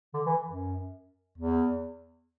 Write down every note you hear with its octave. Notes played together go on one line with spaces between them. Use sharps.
D3
E3
F#2
E2